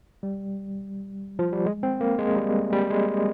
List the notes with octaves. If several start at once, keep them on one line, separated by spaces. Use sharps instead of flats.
G3
F3
G3
G#3
C4
A#3
G#3
G3
G3
G#3